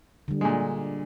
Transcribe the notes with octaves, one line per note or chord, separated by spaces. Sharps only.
D3 G3
A#2 G#3